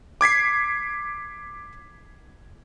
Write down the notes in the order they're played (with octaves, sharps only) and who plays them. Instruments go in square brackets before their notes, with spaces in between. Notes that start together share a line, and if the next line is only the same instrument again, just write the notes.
[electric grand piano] D6 G#6 B6 C7